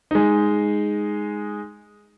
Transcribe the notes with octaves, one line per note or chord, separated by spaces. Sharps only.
G#3 D#4